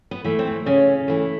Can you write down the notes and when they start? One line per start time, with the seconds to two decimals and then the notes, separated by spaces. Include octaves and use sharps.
0.11 B3
0.24 E3 A3
0.39 C4
0.66 C#3 C#4
1.08 E3 A3